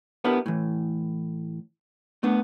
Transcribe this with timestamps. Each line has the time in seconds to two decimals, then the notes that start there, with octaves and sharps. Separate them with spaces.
0.24 B3 D4 E4 G4 A#4 B4
0.46 A2 E3
2.23 A3 B3 D4